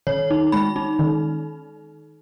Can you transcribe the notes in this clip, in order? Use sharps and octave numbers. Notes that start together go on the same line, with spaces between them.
D#3 C#5
D#4
G#3 B5
D#4
D#3